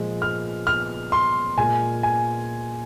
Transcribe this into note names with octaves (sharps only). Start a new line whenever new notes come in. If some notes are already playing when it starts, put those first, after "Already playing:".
Already playing: A#2 F3 G#3
F6
F6
C6
A#2 G#3 G#5
G#5